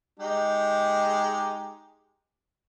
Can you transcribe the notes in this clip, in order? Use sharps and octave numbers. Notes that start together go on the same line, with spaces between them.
G#3 D#4 G4